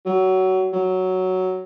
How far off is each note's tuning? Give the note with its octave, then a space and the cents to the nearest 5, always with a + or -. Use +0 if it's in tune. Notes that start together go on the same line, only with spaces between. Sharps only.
F#3 +20
F#3 +5